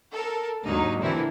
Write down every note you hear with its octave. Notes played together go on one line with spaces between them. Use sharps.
A4 A#4
D#2 G#2 D3 F#3 A#3 D#4
A#2 D3 E3 A#3 C4 E4